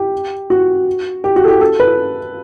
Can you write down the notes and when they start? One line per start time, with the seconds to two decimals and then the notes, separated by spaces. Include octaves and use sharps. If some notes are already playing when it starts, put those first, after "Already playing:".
Already playing: G4
0.50 F#4
1.24 G4
1.36 F#4
1.44 A4
1.48 G4
1.61 A4
1.80 B4